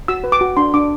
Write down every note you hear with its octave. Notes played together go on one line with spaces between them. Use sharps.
F#4 E6
B4
D6
F#4
D4 C6
D4 D6